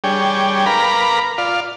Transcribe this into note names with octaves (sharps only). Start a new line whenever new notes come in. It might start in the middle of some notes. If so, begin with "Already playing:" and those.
G3 D4 G#4 C#5 G5
A#4 B4 F5 A#5 B5 D6
F4 D5 F5